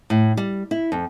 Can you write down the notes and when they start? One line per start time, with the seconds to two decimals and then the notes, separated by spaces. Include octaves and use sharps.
0.10 A2
0.37 G3
0.71 E4
0.92 F2